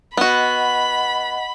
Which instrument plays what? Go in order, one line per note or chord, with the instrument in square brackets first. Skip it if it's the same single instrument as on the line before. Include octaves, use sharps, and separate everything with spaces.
[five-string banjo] B3 F#4 [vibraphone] D#5 F#5 [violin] B5